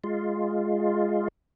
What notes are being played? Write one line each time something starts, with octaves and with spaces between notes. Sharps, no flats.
G#3 F4